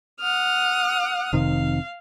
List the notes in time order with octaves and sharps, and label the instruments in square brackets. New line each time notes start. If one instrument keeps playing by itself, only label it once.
[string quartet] F#5 D#6 F6
[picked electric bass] F1 C3 D#3 [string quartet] F5